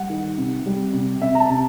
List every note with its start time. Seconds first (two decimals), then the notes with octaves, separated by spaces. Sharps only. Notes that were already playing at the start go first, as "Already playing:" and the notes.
Already playing: G3 F#5
0.10 D#3
0.38 C3
0.66 G3
0.93 C3
1.22 C3 E5
1.35 A#5
1.40 A5
1.50 C3